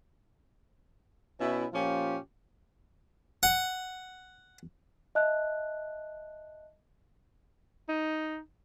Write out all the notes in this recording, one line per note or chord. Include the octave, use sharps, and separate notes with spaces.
B2 C#4 E4
A#2 F3 C#4 F4 G4
F#5
D#5 E5 A5 F#6
D#4